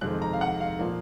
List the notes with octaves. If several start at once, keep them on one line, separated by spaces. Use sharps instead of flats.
F2 C3 D#3 G#3 C4 F#6
A#5
F5
F#5
F5
A#2 F3 A#3